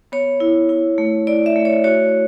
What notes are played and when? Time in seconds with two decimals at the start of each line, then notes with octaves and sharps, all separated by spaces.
0.12 B3 C#5
0.40 E4
0.69 E4
0.98 A3
1.27 E4 D5
1.46 E5
1.56 A3
1.65 C#5
1.84 F#4 C#5